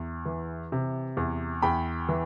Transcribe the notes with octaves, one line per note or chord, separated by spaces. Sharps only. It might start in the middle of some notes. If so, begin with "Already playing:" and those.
Already playing: E2
E3
C3
E2
E2 G5 B5
E3